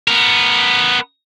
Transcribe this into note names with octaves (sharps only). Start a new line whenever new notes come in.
B3 A#4